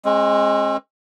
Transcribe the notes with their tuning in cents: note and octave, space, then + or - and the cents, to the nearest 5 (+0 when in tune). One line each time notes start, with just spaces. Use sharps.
G#3 +0 C4 +45